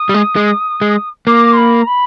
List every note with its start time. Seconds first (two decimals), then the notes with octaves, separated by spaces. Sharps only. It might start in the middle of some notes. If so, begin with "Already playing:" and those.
Already playing: D#6
0.09 G3
0.14 G#3
0.36 G#3
0.81 G#3
1.27 A#3 D6
1.53 C6
1.57 B5
1.82 A#5
1.87 B5